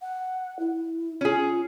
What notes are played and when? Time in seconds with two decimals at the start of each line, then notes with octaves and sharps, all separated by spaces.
0.02 F#5
0.59 E4
1.21 C#4 F4 G#4